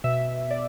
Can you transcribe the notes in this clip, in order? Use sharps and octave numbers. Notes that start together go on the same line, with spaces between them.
B2 E5
D5